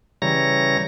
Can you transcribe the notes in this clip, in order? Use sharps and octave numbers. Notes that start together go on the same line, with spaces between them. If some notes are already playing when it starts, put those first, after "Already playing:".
C#3 E3 G3 C#5 A#5 A#6